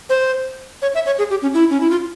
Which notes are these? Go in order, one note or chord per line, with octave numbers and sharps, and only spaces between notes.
C5
C#5
E5
C#5
G#4
G4
C#4
E4
C#4
E4
F4